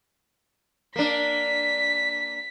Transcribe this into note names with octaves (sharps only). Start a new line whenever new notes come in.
A#3 D4 B6